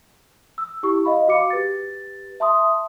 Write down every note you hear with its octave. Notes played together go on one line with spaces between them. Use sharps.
E6
E4 G4 C#6
D#5 F5 B5
F#4 F5 D6 C#7
G4 B4 A6
E5 A5 C6 D#6